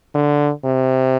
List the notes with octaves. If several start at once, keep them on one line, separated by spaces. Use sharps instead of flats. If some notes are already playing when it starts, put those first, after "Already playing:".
D3
C3